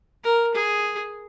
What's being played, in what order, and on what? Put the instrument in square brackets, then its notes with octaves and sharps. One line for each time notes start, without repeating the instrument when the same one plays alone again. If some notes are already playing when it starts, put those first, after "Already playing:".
[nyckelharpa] A#4
G#4